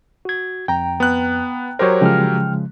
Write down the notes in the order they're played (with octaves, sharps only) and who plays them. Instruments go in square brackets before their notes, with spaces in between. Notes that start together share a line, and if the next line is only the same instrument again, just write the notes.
[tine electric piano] F#4 G#6
[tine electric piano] F2 [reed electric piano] G5 A#5
[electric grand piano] B3 F#6
[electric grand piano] F#3 G4 A#4 [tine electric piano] C5 C#5
[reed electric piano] C#3 F3 G#3 [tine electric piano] G5 F6